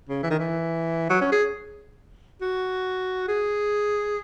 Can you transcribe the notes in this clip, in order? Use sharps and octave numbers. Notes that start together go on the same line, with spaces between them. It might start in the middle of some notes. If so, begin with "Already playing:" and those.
C#3
E3
D#3
E3
F#3
C#4
G#4
F#4
G#4